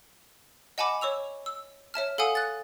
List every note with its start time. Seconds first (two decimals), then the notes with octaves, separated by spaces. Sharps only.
0.78 D#5 F#5 G#5 A5 B5 D6
1.01 C#5 C#6 E6 F7
1.46 E6
1.94 C#5 E5 A5 F6
2.18 A4 F5 F#5 G#5 D#6
2.35 F#6 A6